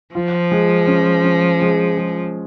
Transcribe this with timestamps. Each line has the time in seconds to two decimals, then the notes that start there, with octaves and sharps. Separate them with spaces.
0.14 F3 F4
0.52 G#3
0.87 C#4
1.24 C#4
1.61 G#3
1.97 G#3